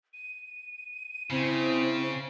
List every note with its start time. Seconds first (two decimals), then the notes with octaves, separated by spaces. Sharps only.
0.13 D#7
1.30 C#3 C4 E4